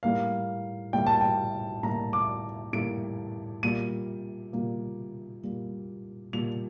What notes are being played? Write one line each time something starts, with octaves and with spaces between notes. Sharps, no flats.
A2 G3 A#3 F5
A2 G3 A#3 G5
A5
G5
A2 G3 A#3 A#5
D6
A2 G3 A#3 D7
A#2 G3 A#3 D#7
A#2 G3 A#3
A#2 G3 A#3
A#2 G3 A#3 F7